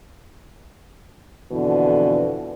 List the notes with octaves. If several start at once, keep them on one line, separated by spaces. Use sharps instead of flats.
F2 B2 D3 E3